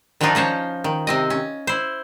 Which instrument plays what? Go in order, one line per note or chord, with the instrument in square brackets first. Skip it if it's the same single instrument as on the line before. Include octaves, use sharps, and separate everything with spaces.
[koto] D#3 F3 F#3 D4 D#4 F4
F3 C#4 C5 C#5
D#3
C3 C4 D#5
C#4
E4 C5